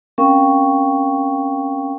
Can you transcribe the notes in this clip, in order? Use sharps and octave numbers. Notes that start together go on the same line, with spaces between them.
C4 C#4 A#4 F5 G5 C#6